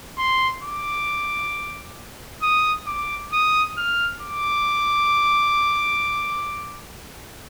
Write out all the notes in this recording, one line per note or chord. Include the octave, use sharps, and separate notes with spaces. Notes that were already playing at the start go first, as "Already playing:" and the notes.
C6
D6
D#6
D6
D#6
F6
D6